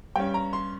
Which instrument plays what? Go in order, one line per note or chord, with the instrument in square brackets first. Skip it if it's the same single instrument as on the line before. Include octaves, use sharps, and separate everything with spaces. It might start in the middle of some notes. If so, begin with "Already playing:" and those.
[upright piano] G2 G3 C#4 G5
A#5
C6